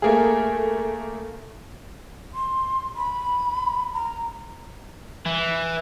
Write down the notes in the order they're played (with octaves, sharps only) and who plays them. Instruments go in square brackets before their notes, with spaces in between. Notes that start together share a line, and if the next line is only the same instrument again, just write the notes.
[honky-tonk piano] A3 A#3 G#4
[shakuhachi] C6
B5
A#5
[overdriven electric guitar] E3